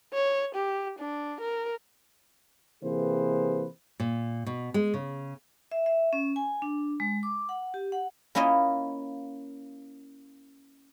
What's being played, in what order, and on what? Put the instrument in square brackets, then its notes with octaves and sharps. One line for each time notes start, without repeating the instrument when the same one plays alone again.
[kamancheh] C#5
G4
D4
A#4
[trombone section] C3 E3 A#3 G#4 B4 C5
[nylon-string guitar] A#2
B2
G#3
C#3
[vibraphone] E5
E5
C#4
G#5
D4
G#3
D6
F#5
G4
F#5
[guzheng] A#3 C#4 E4 F4 D#5